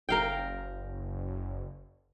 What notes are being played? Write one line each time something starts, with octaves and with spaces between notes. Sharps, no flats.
F#1 A#4 F5 G5